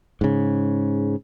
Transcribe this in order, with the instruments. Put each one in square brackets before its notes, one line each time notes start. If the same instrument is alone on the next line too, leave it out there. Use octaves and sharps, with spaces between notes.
[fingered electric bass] G#2 C#3